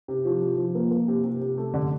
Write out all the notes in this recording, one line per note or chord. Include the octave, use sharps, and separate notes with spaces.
C3
F3
F3
F3
A#3
A#3
C3
C3
C3
A3
D3